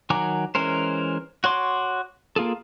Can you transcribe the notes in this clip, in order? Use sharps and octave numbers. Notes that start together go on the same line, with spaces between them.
D#3 F#3 G#5 A#5 D6
E3 G#3 C#4 A#4 C5
F#4 C#5 C6 D6
A#3 F4 G#4 A4